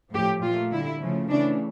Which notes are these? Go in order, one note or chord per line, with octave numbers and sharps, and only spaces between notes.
A2 F3 A3 G4
A#2 F3 A3 F4
D3 G3 E4
C#3 F3 A3
C#3 E3 A3 D4